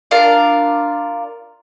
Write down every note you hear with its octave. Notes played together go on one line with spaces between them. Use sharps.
D4 F4 A#4